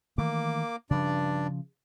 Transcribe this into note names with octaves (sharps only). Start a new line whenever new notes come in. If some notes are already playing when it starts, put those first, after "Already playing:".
D#3 E3 A3 A#3 D6
G2 C#3 F3 D4 D5